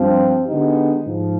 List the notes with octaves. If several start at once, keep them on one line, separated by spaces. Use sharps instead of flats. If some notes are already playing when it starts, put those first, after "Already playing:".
Already playing: G2 F3 C4
D3 G#3 B3 D#4 G4
G#2 F3